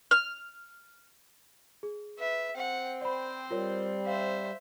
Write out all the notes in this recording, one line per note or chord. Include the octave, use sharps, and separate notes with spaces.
F6
G#4
B4 E5
C4 F#5 G5
C5 D5 B5
G3 F4 A#4 C#5
C5 E5 F5